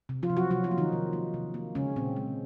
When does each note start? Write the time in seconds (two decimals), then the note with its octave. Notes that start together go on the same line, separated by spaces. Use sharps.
0.09 C3
0.23 F3 F4
0.30 C3
0.37 F#3 F#4
0.50 C3 F#3 F#4
0.64 F3 F4
0.71 A#3
0.78 D#3 D#4
0.92 C3
1.13 A#3
1.34 C3
1.54 A#3
1.75 C#3 G#3 C#4
1.96 A#2 C4
2.16 G#3